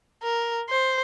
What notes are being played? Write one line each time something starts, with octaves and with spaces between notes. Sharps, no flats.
A#4
C5